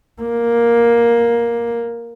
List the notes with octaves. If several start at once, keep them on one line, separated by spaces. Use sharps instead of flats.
A#3